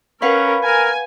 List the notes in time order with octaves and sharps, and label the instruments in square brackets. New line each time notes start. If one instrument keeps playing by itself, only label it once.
[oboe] C#4 [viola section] A#4 [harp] B4 F5 F#5
[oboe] A#4 [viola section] G#5